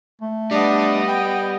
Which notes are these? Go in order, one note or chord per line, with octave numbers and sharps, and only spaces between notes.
A3
G3 B3 D4 D#5
G5